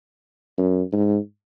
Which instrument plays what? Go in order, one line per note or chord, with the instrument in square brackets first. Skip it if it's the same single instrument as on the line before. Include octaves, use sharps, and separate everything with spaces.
[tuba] F#2
G#2